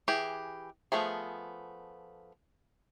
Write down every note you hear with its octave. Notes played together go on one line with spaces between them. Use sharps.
E3 G4 G#4
F3 A3 B3 G#4